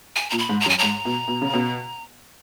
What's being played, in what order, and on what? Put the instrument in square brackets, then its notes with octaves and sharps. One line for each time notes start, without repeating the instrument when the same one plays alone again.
[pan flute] G#5
[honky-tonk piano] A#2 [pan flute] A#5
[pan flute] B5
[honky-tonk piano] G#2
[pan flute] A#5
[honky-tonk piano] F#2
[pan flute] G#5
[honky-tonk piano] G#2 [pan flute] A#5
[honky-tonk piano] B2
B2
C#3
B2